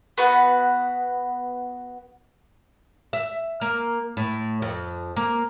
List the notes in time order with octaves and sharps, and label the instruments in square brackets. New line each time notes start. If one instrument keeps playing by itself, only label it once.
[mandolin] B3 F#4 B4 F#5
[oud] E5
A#3
A2
F2
A#3